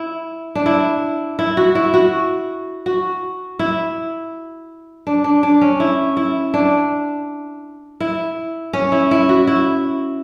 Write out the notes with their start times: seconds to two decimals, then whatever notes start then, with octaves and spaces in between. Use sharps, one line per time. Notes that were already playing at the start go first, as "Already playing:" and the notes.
Already playing: E4
0.55 D4
0.66 E4
1.39 E4
1.57 F#4
1.75 E4
1.94 F#4
2.86 F#4
3.59 E4
5.07 D4
5.24 D4
5.43 D4
5.61 C#4
5.80 E4
6.17 E4
6.54 D4
8.00 E4
8.73 C#4
8.92 E4
9.11 E4
9.29 F#4
9.47 E4